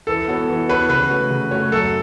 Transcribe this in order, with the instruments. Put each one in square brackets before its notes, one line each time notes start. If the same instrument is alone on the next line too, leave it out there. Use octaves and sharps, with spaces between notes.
[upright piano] E3 [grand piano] A4
[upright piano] B3 F#4 A4 C#5
E3
[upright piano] B3 F#4 A4 C#5 [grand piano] B4
[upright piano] C#3 [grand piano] B4
[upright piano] A3 F#4 C#5
C#3
A3 F#4 C#5
[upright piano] F#2 [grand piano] A4